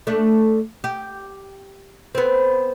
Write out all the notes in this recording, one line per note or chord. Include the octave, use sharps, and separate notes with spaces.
A3 D4
G4
B3 C4